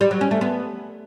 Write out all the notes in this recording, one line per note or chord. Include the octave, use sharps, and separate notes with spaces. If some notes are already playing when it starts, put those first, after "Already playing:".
G3
F#3
C#4
A3
B3